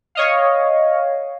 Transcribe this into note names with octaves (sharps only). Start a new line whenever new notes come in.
C#5 D#5 F5